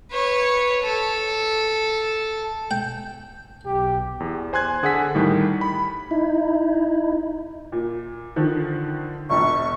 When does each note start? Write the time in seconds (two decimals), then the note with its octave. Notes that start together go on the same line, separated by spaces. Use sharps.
0.11 B4 C#5
0.83 A4
2.71 G5
3.66 B1 G4
4.20 E2
4.53 C5 G#5 C6 F#6 G#6
4.83 D3 G#4 A4 F#5 G#5 B6
5.15 A2 D#3 G3
5.61 B5
6.11 D#4 E4
7.72 A#2
8.36 D3 D#3 F3
9.30 E1 A#1 C#6